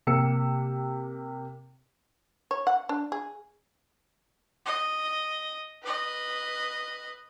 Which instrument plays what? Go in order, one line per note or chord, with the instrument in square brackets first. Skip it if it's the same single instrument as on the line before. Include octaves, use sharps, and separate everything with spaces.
[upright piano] C3 A#3 G4 E6 C#7
[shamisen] C#5
F#5
D4
G#4
[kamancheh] D#5
B4 D#5